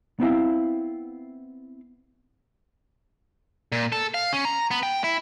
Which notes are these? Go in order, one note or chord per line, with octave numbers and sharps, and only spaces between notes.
B3 C4 E4 F5
A#2
A4
F5
C#4
A#5
B3
G5
E4